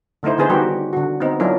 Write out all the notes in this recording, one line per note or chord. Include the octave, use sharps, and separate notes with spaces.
D3 A3 D#4 E4 C5
D3 B3 D#4 G#4 B4 C5
D#3 G3 F#4 G4 A#4
D3 F#4
B3 C4 D#4
F#3 D4 E4 F4 A#4